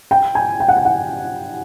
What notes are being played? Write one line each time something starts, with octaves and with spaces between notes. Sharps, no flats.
G5
G#5
G5
F#5
G5
F#5